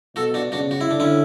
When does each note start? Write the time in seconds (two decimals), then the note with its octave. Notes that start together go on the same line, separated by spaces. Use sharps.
0.16 B2 F#4 A4
0.34 D4 F#4
0.52 C#3 D4 F#4
0.71 F#4
0.81 E4
0.89 D3 D4
1.00 C#4 E4